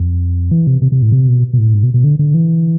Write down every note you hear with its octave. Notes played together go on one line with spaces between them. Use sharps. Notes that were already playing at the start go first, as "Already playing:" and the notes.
Already playing: F2
E3
C3
C3
C3
A2
C3
B2
B2
A2
G#2
B2
B2
D3
D3
E3